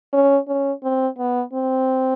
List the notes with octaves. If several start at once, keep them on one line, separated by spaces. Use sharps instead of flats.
C#4
C#4
C4
B3
C4